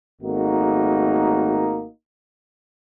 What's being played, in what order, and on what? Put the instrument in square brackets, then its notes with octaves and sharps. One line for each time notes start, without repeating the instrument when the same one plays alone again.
[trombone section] G#1 A3 A#3 D#4 F#4